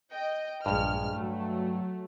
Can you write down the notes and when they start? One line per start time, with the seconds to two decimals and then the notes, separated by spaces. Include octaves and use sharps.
0.12 D#5 G5
0.66 A#1 G2 G#3 F6
1.13 F#3 A3